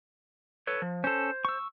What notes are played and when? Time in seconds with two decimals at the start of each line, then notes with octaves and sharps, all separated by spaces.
0.67 A4 B4 C#5
0.82 F3
1.04 C#4 A4 C5
1.45 C#6 E6